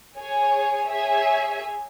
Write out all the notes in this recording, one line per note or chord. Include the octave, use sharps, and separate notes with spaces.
G#4 C#5 G#5
G#4 C#5 E5 G#5